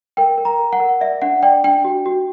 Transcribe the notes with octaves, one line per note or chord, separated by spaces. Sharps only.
A#4 G5
A#4
A#5
A#4
F#5
A#4
D5 E5
D4 F#5
D5 G5
D4 G5
F#4
F#4